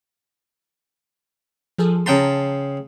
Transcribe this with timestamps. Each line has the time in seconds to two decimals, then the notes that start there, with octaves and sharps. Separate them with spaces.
1.78 F3 G#4 A4
2.06 C#3 G5 A5 A#5 C6